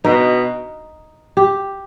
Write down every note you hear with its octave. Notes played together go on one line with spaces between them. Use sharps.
B2 D#4
G4